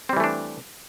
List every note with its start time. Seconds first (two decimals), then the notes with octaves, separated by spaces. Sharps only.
0.09 C4
0.13 G3
0.17 E3
0.20 A3
0.24 D4